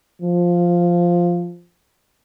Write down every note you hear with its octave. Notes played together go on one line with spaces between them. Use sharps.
F3